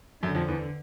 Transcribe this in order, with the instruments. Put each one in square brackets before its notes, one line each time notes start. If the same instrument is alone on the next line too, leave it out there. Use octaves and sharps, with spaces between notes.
[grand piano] F#2 [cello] D3
[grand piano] F2
E2